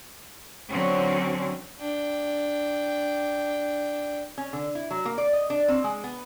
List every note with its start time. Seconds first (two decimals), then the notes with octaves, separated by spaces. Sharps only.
0.71 D3 F#3 C4 C#4
1.78 D4 G5
4.38 C#4
4.53 D3
4.75 E4
4.91 F#3
5.05 A#3
5.18 D5
5.33 D#5
5.50 D4
5.68 C4
5.84 G#3
6.04 B3